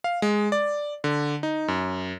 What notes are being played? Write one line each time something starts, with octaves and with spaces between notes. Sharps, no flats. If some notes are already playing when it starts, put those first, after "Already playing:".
F5
G#3
D5
D3
D#4
F#2